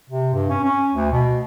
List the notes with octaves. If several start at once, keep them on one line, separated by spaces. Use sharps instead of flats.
C3
G2
C#4
C#4
D2
B2